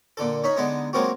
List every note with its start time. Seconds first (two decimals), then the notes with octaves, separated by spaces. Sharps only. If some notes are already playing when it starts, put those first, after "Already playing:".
0.17 A#2 D3 A4
0.44 C#4 D#4 B5
0.57 D3 G#3 B3 D#4
0.93 F#3 G#3 A#3 C4 F4 F#4